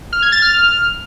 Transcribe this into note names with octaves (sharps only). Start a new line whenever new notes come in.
F6
G#6
A6
F6